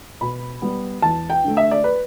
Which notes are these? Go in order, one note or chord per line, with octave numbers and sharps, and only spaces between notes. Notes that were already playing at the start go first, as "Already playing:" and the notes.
B2 B5
G3 B3
E2 A5
G5
D3 A3
E5
D5
B4